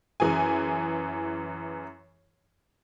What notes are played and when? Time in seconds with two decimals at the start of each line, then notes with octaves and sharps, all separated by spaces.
0.20 F#2 E3 G#4 G#5